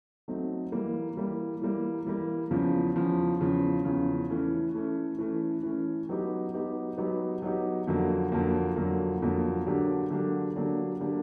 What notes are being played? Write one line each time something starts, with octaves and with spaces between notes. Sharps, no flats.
F#3 A3 C4 D#4
E3 G3 A#3
E3 G3 A#3
E3 G3 A#3
E3 G3 A#3
E2 C#3 F3
E2 C#3 F3
E2 C#3 F3
E2 C#3 F3
E3 A3 C#4
E3 A3 C#4
E3 A3 C#4
E3 A3 C#4
F#3 B3 D#4 G4
F#3 B3 D#4 G4
F#3 B3 D#4 G4
F#3 B3 D#4 G4
F2 D3 F#3 A#3
F2 D3 F#3 A#3
F2 D3 F#3 A#3
F2 D3 F#3 A#3
D3 F#3 A#3 D4 G4
D3 F#3 A#3 D4 G4
D3 F#3 A#3 D4 G4
D3 F#3 A#3 D4 G4